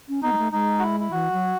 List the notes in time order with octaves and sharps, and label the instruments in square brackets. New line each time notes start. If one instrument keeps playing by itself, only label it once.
[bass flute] C#4
[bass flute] B3 [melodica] D#4
[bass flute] G#3
A3
[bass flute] G#3 [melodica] D#4
[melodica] F#4
E4
E4
[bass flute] E3 [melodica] F#4
[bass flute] F#3